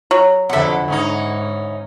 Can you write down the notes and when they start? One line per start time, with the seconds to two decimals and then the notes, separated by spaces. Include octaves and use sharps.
0.11 F#3
0.49 F2 B2 D3 E4 A4 F#5
0.88 G#2 D3 C#4 D#4